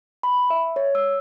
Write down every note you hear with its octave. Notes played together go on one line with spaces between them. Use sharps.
B5
E5
C#5
E6